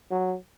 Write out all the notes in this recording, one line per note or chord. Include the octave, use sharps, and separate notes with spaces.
F#3